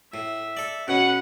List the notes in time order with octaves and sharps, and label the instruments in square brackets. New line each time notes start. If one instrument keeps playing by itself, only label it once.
[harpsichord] A2 [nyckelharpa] E5
[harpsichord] A4 D5
[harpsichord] B2 [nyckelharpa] C#4 B4 [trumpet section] F#5